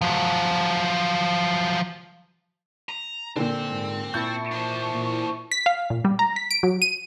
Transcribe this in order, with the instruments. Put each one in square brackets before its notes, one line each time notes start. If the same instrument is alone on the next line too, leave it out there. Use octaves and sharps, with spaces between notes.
[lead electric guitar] F3 F#3
[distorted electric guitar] A#5
[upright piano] A#2 D3 [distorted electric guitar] C4
[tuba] G#2
[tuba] A#2 [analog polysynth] E4 A5 C#6 [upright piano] G6
[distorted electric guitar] D4 C5
[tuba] A#2
[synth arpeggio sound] B6
F5
A#2
G3
A#5
B6
D7
F#3
D#7